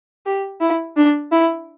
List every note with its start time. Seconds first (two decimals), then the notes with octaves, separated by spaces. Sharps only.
0.26 G4
0.61 E4
0.96 D4
1.32 E4